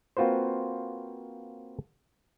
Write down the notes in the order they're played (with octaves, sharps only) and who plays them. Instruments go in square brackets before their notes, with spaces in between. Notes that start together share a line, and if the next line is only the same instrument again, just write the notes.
[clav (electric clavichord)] A#3 C4 F4 F#4 B4 C5